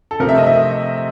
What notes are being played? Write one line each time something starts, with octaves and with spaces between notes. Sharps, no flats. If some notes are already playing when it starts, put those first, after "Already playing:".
A4
C3 F3 A3 C4 A#4
E5
D#5
E5